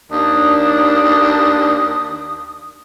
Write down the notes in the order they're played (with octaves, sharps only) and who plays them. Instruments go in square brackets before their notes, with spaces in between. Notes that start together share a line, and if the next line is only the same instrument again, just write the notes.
[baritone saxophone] D#2 [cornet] D4 [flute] D#6